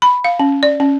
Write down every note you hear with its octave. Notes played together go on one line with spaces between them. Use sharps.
B5
F5
C#4
D5
C#4